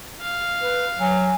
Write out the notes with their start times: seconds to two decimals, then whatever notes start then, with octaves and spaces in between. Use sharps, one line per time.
0.21 F5
0.61 B4
1.00 F#3 G#5